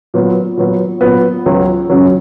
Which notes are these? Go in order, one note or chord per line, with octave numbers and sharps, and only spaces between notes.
A#2 F#3 B3
A#2 F#3 B3
A#2 F#3 B3
C#2 C#3 F#3
C#2 C#3 F#3